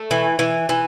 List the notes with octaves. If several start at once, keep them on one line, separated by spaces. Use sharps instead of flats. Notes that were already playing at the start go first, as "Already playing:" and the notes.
Already playing: A3
E3
E3
E3